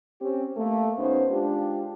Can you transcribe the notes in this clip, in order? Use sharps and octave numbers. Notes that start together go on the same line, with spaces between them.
C4 C#4 G4
A3 A#3
D#2 B3 C#4 D#4 C5
G#3 D4 F4 G4